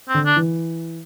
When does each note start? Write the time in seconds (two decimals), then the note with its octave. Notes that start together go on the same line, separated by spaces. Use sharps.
0.09 C4
0.14 D3
0.26 D4
0.36 E3